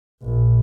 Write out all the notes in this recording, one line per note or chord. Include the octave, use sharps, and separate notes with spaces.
A#1